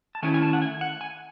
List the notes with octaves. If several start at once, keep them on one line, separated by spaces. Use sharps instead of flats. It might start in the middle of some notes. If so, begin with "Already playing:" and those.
A5
D#3 A3 C#4 E4 G#5
G#5
A5
F#5
G#5
F#5
G#5